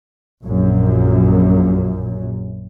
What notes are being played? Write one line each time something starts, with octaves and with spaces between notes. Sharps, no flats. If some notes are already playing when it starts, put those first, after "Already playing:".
A#1 F#2